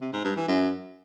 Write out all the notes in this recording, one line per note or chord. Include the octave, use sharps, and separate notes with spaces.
C3
G#2
G2
E3
F#2